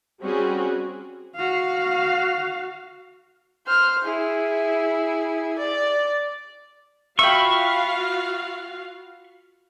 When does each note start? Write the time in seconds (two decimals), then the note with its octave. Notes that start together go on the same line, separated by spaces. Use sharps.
0.21 G3 C4 C#4 F#4 G#4
1.35 F#4 F5
3.67 C5 F6
4.05 E4 G#4
5.59 D5
7.19 F4 F#4 E5 F5 G5 B5 C#6